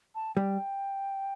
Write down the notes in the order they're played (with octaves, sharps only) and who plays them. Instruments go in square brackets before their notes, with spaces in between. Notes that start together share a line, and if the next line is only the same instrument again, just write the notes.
[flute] A5
[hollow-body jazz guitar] G3 [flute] G5